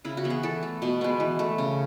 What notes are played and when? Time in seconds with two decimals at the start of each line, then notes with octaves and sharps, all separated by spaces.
0.04 C#3 E4
0.17 F#4
0.24 E3 B3
0.30 G#4
0.43 E3 A4
0.63 A3
0.82 B2
1.01 G#3 B3
1.20 E3
1.39 A3
1.58 C#3